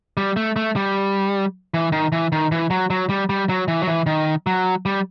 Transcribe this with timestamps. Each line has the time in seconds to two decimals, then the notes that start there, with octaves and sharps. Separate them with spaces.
0.17 G3
0.36 A3
0.56 A3
0.76 G3
1.74 E3
1.92 D#3
2.12 E3
2.32 D#3
2.52 E3
2.70 F#3
2.90 F#3
3.09 G3
3.29 G3
3.49 F#3
3.68 E3
3.82 F#3
3.88 E3
4.06 D#3
4.47 F#3
4.86 G3